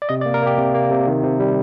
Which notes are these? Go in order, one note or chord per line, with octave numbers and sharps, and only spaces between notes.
D5
C3 D#5
D5
A#3
A#4
A#3 G4
C3
A#3
C3
D#3
C3
G3